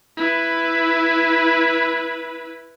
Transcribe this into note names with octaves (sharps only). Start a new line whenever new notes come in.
E4 B4